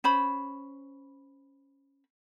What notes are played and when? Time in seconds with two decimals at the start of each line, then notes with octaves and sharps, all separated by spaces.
0.04 C#4 C5 B5